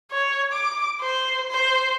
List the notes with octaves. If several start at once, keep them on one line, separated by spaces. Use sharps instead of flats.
C#5
D6
C5
C5